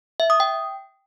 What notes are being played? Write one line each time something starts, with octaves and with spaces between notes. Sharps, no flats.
E5
D#6
G5